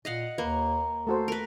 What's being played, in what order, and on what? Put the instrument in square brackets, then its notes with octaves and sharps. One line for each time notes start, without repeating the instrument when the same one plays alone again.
[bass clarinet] A#2 [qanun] D#5 F5 F#5
[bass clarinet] D#2 [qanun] A#3 [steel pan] B4
[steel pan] A3 F#4 C5 [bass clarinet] A4
[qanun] A#4 B4